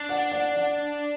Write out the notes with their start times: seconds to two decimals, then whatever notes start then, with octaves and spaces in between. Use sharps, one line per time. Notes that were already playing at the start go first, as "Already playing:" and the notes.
Already playing: D4
0.09 D5 F#5
0.31 D5 F#5
0.54 D5 F#5